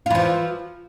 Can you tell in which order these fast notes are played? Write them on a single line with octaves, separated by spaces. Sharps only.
F4 E3 F3